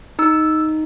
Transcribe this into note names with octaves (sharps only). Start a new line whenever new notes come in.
D#4 E6